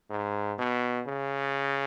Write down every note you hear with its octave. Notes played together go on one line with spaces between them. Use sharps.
G#2
B2
C#3